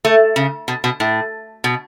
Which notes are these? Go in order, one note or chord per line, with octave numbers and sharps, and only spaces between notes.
A3
C#3
B2
B2
A2
B2